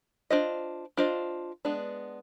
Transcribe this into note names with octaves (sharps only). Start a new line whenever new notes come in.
D4 F4 C5 D#5
D4 F4 C5 D#5
G#3 B3 D4